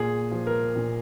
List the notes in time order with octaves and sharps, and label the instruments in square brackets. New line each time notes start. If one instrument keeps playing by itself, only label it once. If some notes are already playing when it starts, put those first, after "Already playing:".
Already playing: [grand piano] A#2 G#4
F3
A#4
A#2